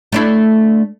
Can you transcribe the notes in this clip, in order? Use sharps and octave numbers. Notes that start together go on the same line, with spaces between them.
A3 D4 E4